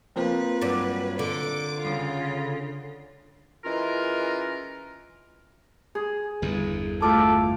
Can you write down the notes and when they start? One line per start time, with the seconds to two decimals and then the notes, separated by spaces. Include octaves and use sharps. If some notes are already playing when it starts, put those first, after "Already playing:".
0.16 F3 A#3 C4 B4
0.61 G2 F#3 D4
1.19 D3 D6
1.81 C#3 F4
3.65 E3 G#3 C#4 F4 A#4
5.95 G#4
6.42 G1 E2 G2
7.02 A3 F4 A4 D6